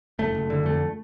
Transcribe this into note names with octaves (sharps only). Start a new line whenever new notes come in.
F#1 A3
F#1
D3
F2 A3